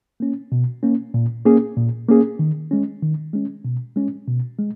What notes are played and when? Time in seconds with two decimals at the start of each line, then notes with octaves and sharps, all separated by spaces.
0.20 A#3 C#4
0.52 B2
0.83 A#3 C#4
1.14 A#2
1.46 A#3 C#4 G#4
1.77 A#2
2.09 A#3 C#4 G#4
2.39 D#3
2.71 G#3 C#4
3.02 D#3
3.33 G#3 C#4
3.65 B2
3.96 G#3 C#4
4.28 B2
4.59 G#3